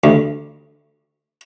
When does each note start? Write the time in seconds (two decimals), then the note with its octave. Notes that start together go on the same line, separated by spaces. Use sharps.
0.04 D2